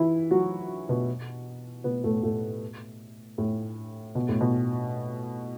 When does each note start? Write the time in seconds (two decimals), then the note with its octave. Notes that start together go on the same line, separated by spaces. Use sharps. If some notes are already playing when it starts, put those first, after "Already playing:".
Already playing: E3 E4
0.31 F#3 F#4
0.89 B2 B3
1.84 B2 B3
2.04 A2 A3
2.23 A2 A3
3.38 A2
4.15 B2
4.29 A2
4.41 B2